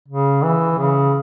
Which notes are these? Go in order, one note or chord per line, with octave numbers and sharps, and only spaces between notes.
C#3
E3
C#3